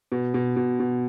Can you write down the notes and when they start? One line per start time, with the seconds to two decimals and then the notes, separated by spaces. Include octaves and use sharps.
0.12 B2
0.34 B2
0.56 B2
0.80 B2